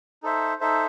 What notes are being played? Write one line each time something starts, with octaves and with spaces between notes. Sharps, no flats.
D#4 A4 C5 E5
D#4 A4 C5 E5